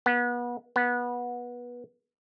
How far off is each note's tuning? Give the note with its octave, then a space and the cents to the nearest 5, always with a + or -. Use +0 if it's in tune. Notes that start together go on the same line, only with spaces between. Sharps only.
B3 -30
B3 -20